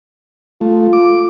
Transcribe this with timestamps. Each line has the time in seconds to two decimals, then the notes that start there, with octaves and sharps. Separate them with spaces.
0.61 A3 F4
0.93 D6